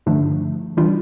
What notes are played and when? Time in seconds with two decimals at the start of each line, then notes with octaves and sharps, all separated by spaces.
0.06 G2 D3 F3 A3 D4
0.77 E3 G3 D4 F4